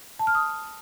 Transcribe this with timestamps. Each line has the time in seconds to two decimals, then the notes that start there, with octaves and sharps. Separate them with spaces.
0.19 A5
0.27 F6
0.35 D#6